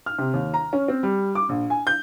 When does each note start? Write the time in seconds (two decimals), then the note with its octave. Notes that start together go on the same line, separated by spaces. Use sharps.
0.06 F6
0.19 C3
0.34 D#2
0.54 A#5
0.73 C#4
0.88 C4
1.03 G3
1.35 D6
1.49 A#1
1.70 G#5
1.87 G6